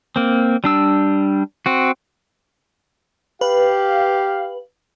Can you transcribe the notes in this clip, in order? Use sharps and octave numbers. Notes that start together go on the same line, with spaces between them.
A#3 C4
G3 D4 E6
C4 F#4
G4 B4 F5